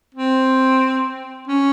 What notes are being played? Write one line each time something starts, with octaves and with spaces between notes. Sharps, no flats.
C4
C#4